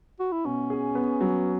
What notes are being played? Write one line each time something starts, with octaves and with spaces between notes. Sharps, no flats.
F#4
E4
B2 C#4
G#4
B3
F#3